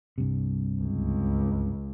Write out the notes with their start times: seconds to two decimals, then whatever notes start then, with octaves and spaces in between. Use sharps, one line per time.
0.18 C2 G2 C3
0.82 C#2